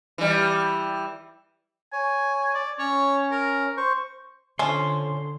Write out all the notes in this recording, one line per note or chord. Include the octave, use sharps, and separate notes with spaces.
E3 G3
C#5 G#5
D5
C#4 C#5
A#4
C5 C#6
D3 F3 C#4 C6